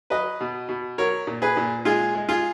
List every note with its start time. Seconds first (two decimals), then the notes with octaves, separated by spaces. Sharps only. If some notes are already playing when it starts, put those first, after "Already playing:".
0.10 F#3 B4 D#5
0.40 B2
0.68 B2
0.98 F#3 A#4 C#5
1.27 A#2
1.42 G#4 B4
1.57 A#2
1.85 G#3 F4 G#4
2.15 G#3
2.29 F4 G#4